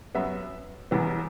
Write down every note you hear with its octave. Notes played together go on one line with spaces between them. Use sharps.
F#2 F#3 B3 E5
E1 E2 E3 B3